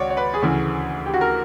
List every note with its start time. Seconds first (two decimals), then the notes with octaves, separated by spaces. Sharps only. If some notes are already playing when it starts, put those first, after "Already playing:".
Already playing: C#2 F#4 C#5 D5
0.10 C#5
0.17 B4
0.34 G#4
0.42 D2 C#3 E3
1.06 G4
1.14 F#4
1.21 A#4